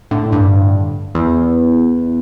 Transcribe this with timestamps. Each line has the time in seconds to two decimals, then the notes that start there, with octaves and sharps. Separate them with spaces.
0.11 A2 D3
0.32 G2
1.15 E2